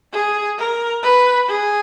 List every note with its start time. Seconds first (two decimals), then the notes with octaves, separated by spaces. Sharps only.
0.13 G#4
0.58 A#4
1.03 B4
1.48 G#4